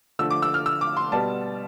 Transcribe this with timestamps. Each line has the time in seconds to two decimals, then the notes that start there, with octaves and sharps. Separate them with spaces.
0.19 D3 F3 A3 E6
0.31 D6
0.42 E6
0.54 F6
0.66 E6
0.81 D6
0.97 C6
1.12 B2 G3 B3 A5